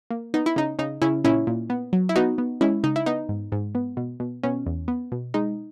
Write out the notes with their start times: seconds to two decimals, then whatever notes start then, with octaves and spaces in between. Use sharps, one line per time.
0.10 A#3
0.34 B3 D#4
0.46 E4
0.56 C#3 D#4
0.79 C#3 D#4
1.02 C#3 C#4 E4
1.24 A#2 C#4 E4
1.47 A#2
1.70 B3
1.93 F#3
2.09 E4
2.16 B3 D#4 F#4
2.38 B3
2.61 G#3 C#4 E4
2.84 C#3 D#4
2.96 E4
3.06 B3 D#4
3.29 G#2
3.52 G#2
3.75 B3
3.97 B2
4.20 B2
4.43 B2 C#4
4.66 E2
4.88 B3
5.12 B2
5.34 G#3 D#4